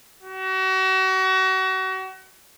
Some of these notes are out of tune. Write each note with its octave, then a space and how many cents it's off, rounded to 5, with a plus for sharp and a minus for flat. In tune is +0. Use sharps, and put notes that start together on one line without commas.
F#4 +35